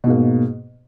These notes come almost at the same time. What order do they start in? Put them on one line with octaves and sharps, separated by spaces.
B2 G#2 A#3